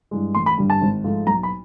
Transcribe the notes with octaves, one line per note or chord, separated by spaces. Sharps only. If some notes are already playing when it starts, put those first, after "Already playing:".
G2 E3 G#3
A1 C6
B5
G2 D3 G3
A5
G#1
G#2 F3 A3
B1 A#5
B5